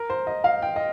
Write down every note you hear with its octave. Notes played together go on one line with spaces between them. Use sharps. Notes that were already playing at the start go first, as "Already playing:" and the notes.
Already playing: A#4
C5
D#5
F5
G5
D#5